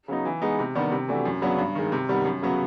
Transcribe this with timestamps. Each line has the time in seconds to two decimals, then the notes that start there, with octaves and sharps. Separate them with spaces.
0.08 C#3 F#3 B3 D#4
0.25 E3
0.42 G#3 B3 D#4
0.59 C3
0.75 D#3 G3 B3 D4
0.92 C3
1.08 E3 A3 D4 F#4
1.25 F#2
1.42 C#3 F#3 B3 D4
1.58 G2
1.75 D#3 G#3
1.92 C3
2.08 D#3 G3 B3
2.25 F#2
2.42 C#3 F#3 B3